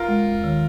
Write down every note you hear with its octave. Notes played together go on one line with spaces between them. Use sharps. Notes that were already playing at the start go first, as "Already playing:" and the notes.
Already playing: F4 A#4
G#3
D#2
D#3